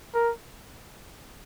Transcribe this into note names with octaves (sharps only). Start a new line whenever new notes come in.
A#4